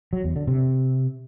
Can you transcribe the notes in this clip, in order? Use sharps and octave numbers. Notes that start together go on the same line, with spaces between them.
F#3
E2
D3
C3